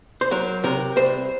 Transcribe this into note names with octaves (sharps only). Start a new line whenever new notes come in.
C5
F#3 A#4
C3 A#4
C2 C5